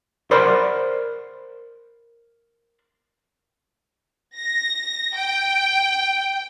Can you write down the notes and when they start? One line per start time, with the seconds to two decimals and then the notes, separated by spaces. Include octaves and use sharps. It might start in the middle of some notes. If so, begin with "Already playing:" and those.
0.31 A#4 C5 D5 F#5 B5 C6
4.37 A#6
5.15 G5